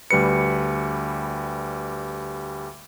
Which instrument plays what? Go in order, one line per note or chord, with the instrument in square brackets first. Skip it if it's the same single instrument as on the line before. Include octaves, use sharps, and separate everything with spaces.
[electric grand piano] D2 G3 B4 C#7